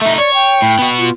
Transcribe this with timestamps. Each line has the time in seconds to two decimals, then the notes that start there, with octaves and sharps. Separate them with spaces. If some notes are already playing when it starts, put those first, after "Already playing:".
0.01 A3 D#4 E5
0.18 C#5 D5
0.34 G5
0.62 A2
0.79 B3 F#4
0.98 F4